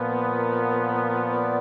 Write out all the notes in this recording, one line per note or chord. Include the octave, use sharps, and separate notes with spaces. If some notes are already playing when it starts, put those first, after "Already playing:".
Already playing: A#2 F3 B3
A#4
A#4
D5